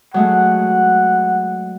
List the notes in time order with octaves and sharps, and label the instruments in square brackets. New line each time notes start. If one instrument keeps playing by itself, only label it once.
[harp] F#3 G#3 A3 [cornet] F#5